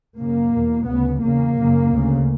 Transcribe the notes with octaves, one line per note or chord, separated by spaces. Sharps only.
F#2 C#3 A#3
E2 B2
D2 C#3 B3
E2 C#3 A#3
F#2 C#3
D2 C#3